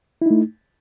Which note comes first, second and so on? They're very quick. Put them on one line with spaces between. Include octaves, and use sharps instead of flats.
E4 D#4 A3